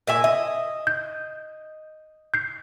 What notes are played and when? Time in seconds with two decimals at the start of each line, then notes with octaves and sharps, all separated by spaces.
0.07 A#2 E5 G#5
0.24 D#5 E5
0.87 G6
2.34 G6 C7